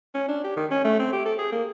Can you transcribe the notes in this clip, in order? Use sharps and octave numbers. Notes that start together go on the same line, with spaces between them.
C#4
D4
G4
D#3
C#4
A3
C4
G4
A4
G#4
A#3